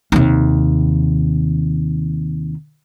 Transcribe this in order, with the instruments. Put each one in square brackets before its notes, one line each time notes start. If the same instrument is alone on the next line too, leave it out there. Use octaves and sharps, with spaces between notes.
[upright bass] D#2 C3